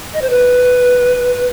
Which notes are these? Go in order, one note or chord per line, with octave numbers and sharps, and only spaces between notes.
D#5
C5
B4